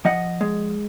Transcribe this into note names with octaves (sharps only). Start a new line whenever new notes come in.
F3 D#5 F#5
G#3